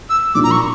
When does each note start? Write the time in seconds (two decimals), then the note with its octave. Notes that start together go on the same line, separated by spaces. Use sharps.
0.10 E6
0.34 A#2 G3 D4 F4 D6
0.44 A#5
0.51 C#6